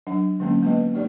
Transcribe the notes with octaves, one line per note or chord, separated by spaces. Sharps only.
F#3 D4 F#5
D3 F#3 G#3 A#3 B3 C#4
G#3 A#3 B3 F4 B4 D#5
A3 D#4 G4 D5